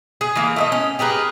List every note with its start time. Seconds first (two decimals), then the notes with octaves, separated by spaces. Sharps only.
0.21 G#4
0.36 E3 A#3
0.56 A3 A4 D#5
0.72 C#4
0.99 G4 G#4 A#4 B4